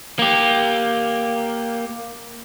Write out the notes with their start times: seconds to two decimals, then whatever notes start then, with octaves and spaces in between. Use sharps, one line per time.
0.19 A#3 G4